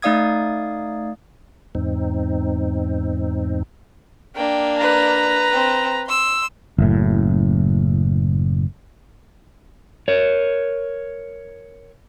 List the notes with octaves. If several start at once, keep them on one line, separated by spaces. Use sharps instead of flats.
A3 D#4 D5 F5 D#6 G#6
E2 G#2 C4 D#4
A#3 D4 G5
B4 A#5
C4
C6 E6
F#1 A2
A#4 C#5